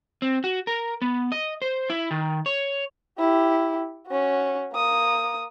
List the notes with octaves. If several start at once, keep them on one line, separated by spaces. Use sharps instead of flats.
C4
F#4
A#4
B3
D#5
C5
E4
D#3
C#5
E4 G4
C#4 F#4
A#3 D#6